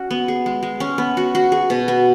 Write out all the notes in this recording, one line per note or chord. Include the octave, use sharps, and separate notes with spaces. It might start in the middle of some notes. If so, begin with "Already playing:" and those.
Already playing: C#4 F#4
B3
G#4
G#3
G#3
C#4
B3
F#4
F#4
G#4
B2
B3